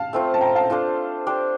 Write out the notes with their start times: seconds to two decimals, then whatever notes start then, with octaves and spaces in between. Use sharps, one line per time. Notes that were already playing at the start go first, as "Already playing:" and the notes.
Already playing: F5 A5
0.13 A3 C4 F4
0.34 A5
0.41 G5 A#5
0.55 F5 A5
0.70 D4 F4 A4 C5
1.27 D4 G4 C5